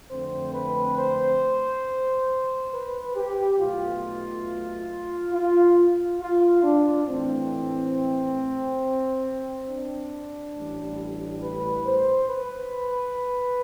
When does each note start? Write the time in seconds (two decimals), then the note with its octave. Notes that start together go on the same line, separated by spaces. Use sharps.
0.11 F2 D3 A3 C4 C5
0.54 B4
0.98 C5
2.73 B4
3.16 G4
3.59 B1 B2 A3 F4
5.34 F4
6.20 F4
6.63 D4
7.07 A2 E3 A3 C4
9.68 D4
10.56 A1 A2 G3
11.42 B4
11.86 C5
12.29 B4